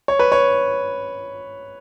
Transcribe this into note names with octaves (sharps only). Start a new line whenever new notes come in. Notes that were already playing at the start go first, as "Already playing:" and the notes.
C#5
B4
C#5